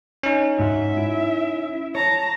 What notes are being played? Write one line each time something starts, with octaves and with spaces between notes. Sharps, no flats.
C#4 D#4
G#2 F#4 E5
E4
C#5 A5 A#5